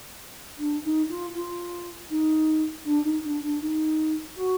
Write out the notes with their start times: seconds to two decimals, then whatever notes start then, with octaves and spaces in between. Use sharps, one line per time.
0.58 D4
0.84 D#4
1.09 F4
1.34 F4
2.10 D#4
2.85 D4
3.04 D#4
3.24 D4
3.43 D4
3.61 D#4
4.36 F#4